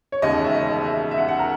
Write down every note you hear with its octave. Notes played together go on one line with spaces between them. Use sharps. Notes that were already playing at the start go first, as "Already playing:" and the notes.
C#5
E1 D#2 C#3 G#3 D#5
E5
D#5
D#5
E5
E5
F#5
F#5
A#4